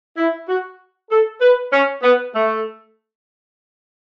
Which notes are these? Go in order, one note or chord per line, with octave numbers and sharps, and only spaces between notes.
E4
F#4
A4
B4
C#4
B3
A3